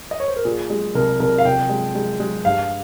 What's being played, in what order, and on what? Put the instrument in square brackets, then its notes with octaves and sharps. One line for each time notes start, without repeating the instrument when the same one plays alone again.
[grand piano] D#5
C#5
C5
A#4
[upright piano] A#2 [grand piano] G#4
[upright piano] G#3
[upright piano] C2 [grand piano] A#4
[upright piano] C2 [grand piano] A#4
[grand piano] F5
[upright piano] C2 [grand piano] G5
[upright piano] G#3
G#3
G#3
[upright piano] G2 [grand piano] F5